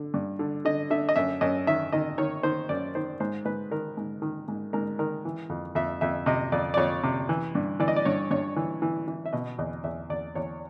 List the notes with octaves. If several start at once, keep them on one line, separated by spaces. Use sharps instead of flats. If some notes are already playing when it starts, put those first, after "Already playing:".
Already playing: D3
G2
D3
D3 D#5
D3 E5
D#5
F#2 E5
F#2 D#5
D#3 E5
D#3 D#5
D#3 C#5
D#3 C5
F#2 D5
D#3 C5
G#2 C5
G#2 B4
D#3 A#4
G#2
D#3
G#2
G#2 A#4
D#3 A#4
E3
F2
F2 E5
F2 E5
C3 D#5
F2 D5
D5
F2 C#5
C3
E3
G2
E3 D5
D#5
D5
G2 C#5
G2 C#5
E3
E3
E3
E5
B2 D#5
E2 D#5
E2 E5
E2 D5
E2 C#5